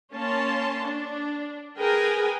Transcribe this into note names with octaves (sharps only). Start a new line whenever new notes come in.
A#3 C#4 C#5 A5 C6
D4
G#4 A#4 B4 G5 G#5